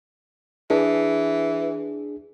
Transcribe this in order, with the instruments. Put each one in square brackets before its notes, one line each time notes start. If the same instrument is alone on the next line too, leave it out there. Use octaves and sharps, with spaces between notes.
[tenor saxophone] E3 [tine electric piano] D4 G#4